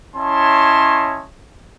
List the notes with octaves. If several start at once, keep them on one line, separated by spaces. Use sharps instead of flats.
C#4 E4 C#5 D#5 A5 C6